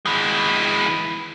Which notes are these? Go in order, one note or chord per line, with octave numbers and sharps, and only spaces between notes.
E3 G#3